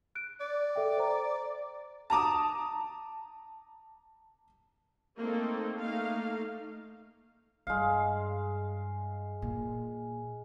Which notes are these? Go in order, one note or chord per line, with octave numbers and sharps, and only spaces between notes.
F#6 D7
D5
A4 E5 G5
C5 A#5
A5 A#5 D6 D#6
A3 A#3 C4 D#4 A4
A3 A#3 D#4 F5
G2 G#3 F5
A#2